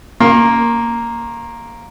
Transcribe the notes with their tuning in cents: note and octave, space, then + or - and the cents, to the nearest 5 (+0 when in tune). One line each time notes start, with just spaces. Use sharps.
A#3 +0 C6 +45